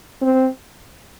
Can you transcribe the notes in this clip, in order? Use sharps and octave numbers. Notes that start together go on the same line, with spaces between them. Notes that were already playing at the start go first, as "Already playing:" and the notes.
C4